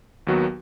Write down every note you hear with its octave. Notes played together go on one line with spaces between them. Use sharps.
D#2 D#3 F#3 B3 F#4